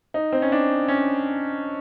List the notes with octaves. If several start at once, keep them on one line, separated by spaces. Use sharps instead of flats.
D#4
C4
C#4
D4
C#4